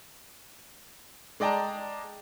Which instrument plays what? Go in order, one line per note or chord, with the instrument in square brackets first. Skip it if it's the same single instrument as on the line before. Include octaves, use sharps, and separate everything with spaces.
[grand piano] G#3 D5 D#5 G5 A5 A#5